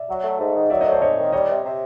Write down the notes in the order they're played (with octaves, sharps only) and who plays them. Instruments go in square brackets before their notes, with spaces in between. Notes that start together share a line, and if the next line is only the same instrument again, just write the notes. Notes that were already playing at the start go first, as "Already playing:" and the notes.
Already playing: [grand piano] D5 E5
[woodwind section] F#3
A3
G#2
D#3
[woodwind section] F#3 [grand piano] D5 E5
[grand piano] C#5 D#5
[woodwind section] A3
[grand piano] C5 D5
[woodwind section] G#2 [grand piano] C#5 D#5
[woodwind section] D#3
[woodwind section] G3 [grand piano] C#5 D#5
[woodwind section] C3
C3